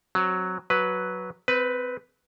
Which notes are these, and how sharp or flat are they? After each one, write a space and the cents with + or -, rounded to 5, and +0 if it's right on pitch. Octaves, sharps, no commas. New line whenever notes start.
F#3 +0 C4 +15
F#3 +0 B4 +0
C4 -20 B4 +5